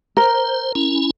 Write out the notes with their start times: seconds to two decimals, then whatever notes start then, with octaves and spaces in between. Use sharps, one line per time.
0.17 A#4 C5
0.75 C#4 E4